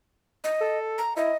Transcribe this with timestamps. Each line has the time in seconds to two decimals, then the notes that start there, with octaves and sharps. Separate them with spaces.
0.44 D#5
0.61 A4
0.98 A#5
1.16 E4 D#5